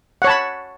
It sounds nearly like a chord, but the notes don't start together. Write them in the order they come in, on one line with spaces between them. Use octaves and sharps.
F#5 C#5 A5 B5